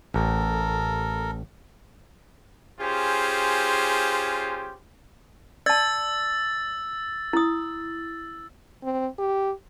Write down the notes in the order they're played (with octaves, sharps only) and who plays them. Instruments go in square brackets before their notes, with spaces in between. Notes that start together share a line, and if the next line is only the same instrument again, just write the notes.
[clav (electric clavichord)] A1 [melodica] A4 A#4
[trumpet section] C#4 F4 G4 G#4 C5
[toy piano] D5 A5 [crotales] E6 A6
[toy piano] E4 D#6
[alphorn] C4
G4